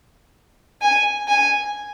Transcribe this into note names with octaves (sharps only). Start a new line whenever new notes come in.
G#5
G#5